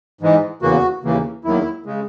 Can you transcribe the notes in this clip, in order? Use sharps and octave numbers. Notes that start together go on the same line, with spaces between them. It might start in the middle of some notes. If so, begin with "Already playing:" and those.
G#2 E3 G#3
E2 C#3 E3 A#3 F#4
D#2 C#3 E3 A#3
E2 D#3 F#3 A#3 E4
C#3 G#3